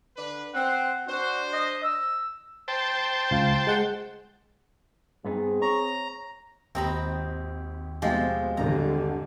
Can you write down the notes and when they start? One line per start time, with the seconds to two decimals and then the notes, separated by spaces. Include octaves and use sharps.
0.17 D3 D4 B4
0.54 C4 F#5
1.09 D4 F#4 C5
1.53 D#5
1.84 E6
2.68 C5 G5 A5
3.31 C#2 F4
3.67 G#3 F#5
5.25 G2 B3 C4 D#4 G#4
5.62 C#5 A#5
6.75 G#1 D#2 C4 G4 A#5 B5 D#6
8.02 B2 F3 G#3 A3 C4 G4
8.57 G#1 G2 D3 D5 A#5